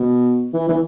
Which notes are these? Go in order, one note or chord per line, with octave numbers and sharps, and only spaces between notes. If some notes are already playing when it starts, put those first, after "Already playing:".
Already playing: B2
E3
E3